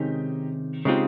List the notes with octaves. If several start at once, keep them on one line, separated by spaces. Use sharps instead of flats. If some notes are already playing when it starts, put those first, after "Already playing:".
Already playing: C3 D#3 G#3 C#4 D#4 G4
C#3 G#3 C4 D#4 F4 G4